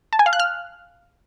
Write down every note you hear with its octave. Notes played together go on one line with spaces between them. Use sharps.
A5
G#5
F5
F#6
F6